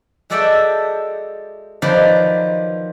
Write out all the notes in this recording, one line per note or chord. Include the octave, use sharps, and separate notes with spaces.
G#3 F#4 A4 D5 E5 G5
D#3 F3 F#3 B4 D5